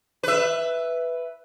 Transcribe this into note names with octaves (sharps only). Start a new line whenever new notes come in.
B4 E5